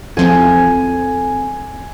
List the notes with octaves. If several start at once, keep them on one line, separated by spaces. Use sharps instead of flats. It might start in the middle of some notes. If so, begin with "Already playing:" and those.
E2 F3 C4 A4 G#5